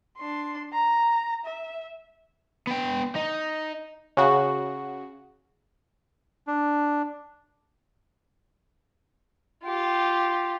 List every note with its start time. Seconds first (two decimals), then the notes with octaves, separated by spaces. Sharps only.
0.18 D4 C6
0.73 A#5
1.45 E5
2.67 B3 G5
3.16 D#4
4.17 C#3 F#4
6.47 D4
9.64 F4 G4